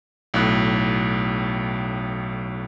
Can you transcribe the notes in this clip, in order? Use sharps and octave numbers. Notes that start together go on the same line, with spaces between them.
B1 A2 F#6